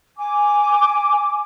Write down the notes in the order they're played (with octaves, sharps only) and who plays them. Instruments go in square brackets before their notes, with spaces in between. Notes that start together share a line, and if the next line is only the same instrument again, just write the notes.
[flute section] G#5 D6